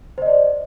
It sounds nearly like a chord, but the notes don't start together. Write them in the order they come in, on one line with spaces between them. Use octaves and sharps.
C5 D#5 D5